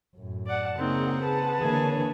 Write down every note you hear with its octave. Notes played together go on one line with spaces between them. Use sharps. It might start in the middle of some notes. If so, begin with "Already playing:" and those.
F#2 A2
D5 F#5 A5
C#3 A#3 C4 D#4 G#4 F#5
B4 A5
D3 E3 A#3 G#4 C#5 G#5